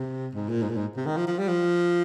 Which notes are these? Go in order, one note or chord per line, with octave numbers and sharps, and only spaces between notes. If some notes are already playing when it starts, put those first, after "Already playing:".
Already playing: C3
G#2
A#2
G#2
A#2
G#2
C3
D#3
F3
F3
G3
F3